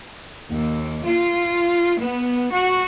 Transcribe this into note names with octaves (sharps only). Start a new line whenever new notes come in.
D#2
F4
B3
F#4